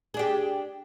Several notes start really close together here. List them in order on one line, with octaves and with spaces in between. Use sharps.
G#4 D4 G4